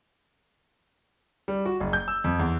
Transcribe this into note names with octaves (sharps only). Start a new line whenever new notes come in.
G3
F#4
F#1
G6
E6
F2
E2